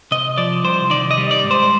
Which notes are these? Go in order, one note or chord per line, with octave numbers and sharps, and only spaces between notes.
C3 D#5
F3 D5
C2 C5
D#3 D5
D#5
G3
D5
G#2
C5